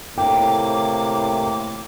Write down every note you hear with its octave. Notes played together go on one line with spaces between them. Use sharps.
A2 C3 A#3 G5 D6